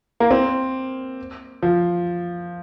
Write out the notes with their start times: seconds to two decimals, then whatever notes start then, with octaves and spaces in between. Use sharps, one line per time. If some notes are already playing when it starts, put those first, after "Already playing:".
0.20 A#3
0.31 C4
1.63 F3